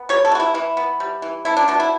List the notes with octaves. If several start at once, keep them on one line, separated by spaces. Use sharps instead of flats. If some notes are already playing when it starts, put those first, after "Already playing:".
Already playing: B3
G3 C#5
A4
E3 F#4
E4
E3 E4
B3
G3
E3
A3 E4
D4
B2 D4
E4